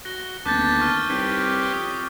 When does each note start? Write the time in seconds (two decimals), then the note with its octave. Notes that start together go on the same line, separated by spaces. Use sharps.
0.05 F#4 A#6 G7
0.46 D#1 D2 B3 A5 D6 G6 A6
0.80 D#3 C#6 F6 G7
1.10 C2 C4 G4 B4 C#5
1.73 F2 D#6